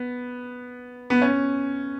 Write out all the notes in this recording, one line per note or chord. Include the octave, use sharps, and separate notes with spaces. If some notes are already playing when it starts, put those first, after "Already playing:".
Already playing: B3
B3
C#4